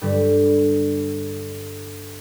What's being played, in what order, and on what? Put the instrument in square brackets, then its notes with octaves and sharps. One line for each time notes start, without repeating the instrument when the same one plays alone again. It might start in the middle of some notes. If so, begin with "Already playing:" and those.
[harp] G2 D3 G3